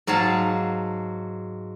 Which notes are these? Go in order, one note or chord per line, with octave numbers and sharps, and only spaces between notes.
G#2 F#3 G#4 F5 A5